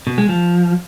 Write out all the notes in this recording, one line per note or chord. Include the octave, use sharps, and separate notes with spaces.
B2
G#3
F3